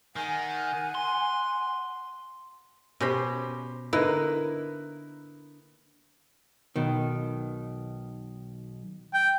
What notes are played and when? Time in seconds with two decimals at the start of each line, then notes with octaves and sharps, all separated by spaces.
0.16 D#3 F#5 G#5
0.95 C6
3.00 B2 C#4 G4 C5 D#5 B5
3.93 D3 A#3 D#4 E4 B4
6.76 B1 B2 D#3
9.14 G5